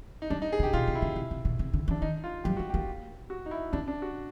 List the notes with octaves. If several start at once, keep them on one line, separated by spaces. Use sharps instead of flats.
D#4
G3 D4
D#4
G#4
C3
G4
B2 F4
C3
E4
C#3
C3
C3
B2
C3
D3
E3
D4
D#3 D#4
F4
F#3 G4
G3 F#4
A#3 G4
F#4
D#4
E4
C#4 D4
D4
F#4